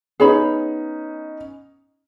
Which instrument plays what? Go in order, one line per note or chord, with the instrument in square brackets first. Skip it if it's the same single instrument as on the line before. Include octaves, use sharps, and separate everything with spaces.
[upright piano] B3 C#4 D#4 [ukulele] G#4 C#5 B5